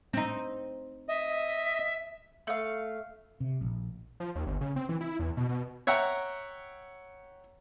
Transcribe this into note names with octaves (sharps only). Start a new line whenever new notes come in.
C4 D#4
D#5 E5
A3 F5
C3
A#1
F3
D#2
G1
C#3
C4
E3
E4
E2
B2
B2
C#5 E5 F#5 G5 A#5